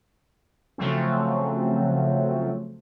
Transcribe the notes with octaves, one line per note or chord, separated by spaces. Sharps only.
C#3 F3 F#3 A3 C4